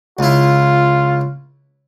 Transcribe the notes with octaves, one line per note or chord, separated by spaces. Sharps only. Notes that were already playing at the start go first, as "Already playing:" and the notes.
C#2 E4 F4